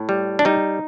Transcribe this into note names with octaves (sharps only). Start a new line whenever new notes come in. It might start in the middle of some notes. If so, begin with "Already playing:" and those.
Already playing: A2
G3
D4
G3 D#4